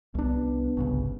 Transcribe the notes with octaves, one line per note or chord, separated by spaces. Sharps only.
C2 B3 D4
G1 C2 C#3